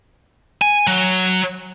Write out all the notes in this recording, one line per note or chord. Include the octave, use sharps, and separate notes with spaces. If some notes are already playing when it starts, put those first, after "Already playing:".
G#5
F#3